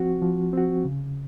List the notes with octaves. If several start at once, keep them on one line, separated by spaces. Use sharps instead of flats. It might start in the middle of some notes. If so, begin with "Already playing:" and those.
Already playing: F3 C4 F#4
F3
C4 F#4
C#3